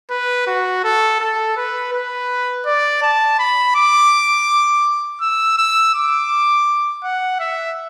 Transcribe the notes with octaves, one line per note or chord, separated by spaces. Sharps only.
B4
F#4
A4
A4
B4
B4
D5
A5
B5
D6
E6
E6
D6
F#5
E5